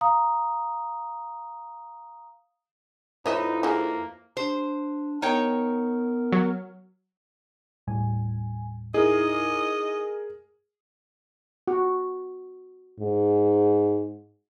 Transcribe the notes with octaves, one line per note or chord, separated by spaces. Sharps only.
F5 A#5 D#6
F2 D#4 E4 B4 C#5 D#5 E5
G#3 A#3 D#4
D4 C5
B3 D#4 A#4 C#5 G5
F#3
D#2 A2 G3 G#5
D#4 E4 G#4 A#4 D#5
F#4
G#2